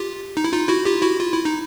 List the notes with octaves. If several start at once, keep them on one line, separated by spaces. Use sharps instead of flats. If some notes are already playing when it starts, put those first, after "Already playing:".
Already playing: F4 G4
D#4
E4
D#4 F4
E4 F#4
F4 G4
E4 F#4
F4
E4
D#4